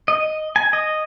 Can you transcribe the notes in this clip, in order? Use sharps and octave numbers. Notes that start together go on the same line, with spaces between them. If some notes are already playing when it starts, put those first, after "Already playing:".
D#5
G#5
D#5